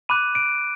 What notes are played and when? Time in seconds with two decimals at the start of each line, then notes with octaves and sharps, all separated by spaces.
0.09 B5 D6 F#6 D#7
0.35 D7